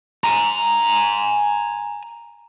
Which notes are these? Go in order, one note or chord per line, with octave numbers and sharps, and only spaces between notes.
G#5 A#5